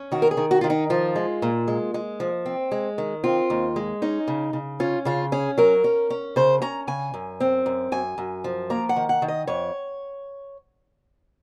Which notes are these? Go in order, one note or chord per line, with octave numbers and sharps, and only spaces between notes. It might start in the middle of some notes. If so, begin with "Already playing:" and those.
Already playing: C#4
D#3 F#4
A#4
G#4
D#3
F#4
D#3 F4
D#4
F3 F4
G#3
A#2
G#3
G#3
F3
C4
G#3
D#3
C4 F4
D#2
G#3
C#4 D#4
C#3
C#3
C#4 F4
C#3 F4
C#4 G#4
F#3 A#4
C#4
C#4
C#3 C5
C#4 A#5
C#3 G#5
F#2
C4
F#2
F#2 G#5
F#2
F3
A#3 A#5
F#5
D#3
F#5
D#3
D#5
F2 C#5